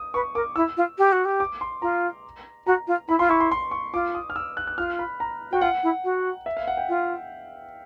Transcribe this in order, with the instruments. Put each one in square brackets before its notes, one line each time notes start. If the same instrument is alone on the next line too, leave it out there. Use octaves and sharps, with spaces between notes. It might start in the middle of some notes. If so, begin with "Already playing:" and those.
Already playing: [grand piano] D#6
[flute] B4 [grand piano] C#6
[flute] A#4 [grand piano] D6
[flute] E4 [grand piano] E6
[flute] F4
G4
F#4
G4
[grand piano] D6
C6
[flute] F4 [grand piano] A#5
[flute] F#4 [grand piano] A#5
[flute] F4
[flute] E4 [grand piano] B5
[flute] F4 [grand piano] C6
[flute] E4 [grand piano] C#6
[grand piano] C6
C6
C#6
[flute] F4 [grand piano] D6
[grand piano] D#6
F6
E6
F#6
F#6
[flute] F4 [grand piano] F6
[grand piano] B5
A#5
[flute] F#4 [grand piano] G5
[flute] F4 [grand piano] F#5
[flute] E4
F#4
[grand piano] E5
F5
F#5
G5
[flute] F4